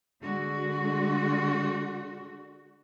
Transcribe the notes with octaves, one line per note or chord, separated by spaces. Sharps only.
D3 G#3 F#4